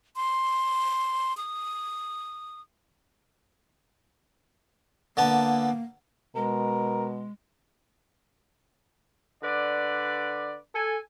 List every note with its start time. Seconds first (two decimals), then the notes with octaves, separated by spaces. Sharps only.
0.16 C6
1.37 D#6
5.17 D3 A#3 B3 A5
6.36 B2 G#3 A#4
9.43 D3 B4 D5
10.74 A4 G#5